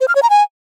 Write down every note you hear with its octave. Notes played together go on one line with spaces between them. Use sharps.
C5
F6
C#5
A#5
G#5